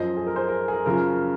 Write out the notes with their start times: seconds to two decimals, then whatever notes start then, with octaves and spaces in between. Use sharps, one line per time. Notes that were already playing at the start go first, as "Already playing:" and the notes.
Already playing: F#2 F3 C5 D#5
0.17 G#4
0.27 A#4
0.36 G#4 C5
0.48 A#4
0.68 G#4
0.73 A#4
0.86 F#2 C#3 F3 A#4